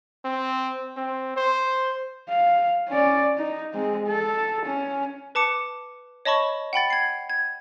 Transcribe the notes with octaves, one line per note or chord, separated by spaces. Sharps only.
C4
C4
C5
F5
C#4 D5
D#4
G#3 C4
A4
C#4
B4 A5 D6 C#7
C#5 D#5 A5 B5 C#6
F#5 G5 B5 A6
G#6 C7
G#6